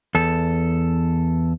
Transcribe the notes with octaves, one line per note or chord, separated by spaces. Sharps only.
E2 A4